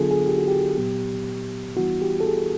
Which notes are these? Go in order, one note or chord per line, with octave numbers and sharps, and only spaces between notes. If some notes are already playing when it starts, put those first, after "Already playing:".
Already playing: D3 F#3 B3 D4 F4 G#4 A4
G#4
G4
F#4
G4
A#2 F#3 B3
E3 G3 B3 E4 F#4
G4
A4
G#4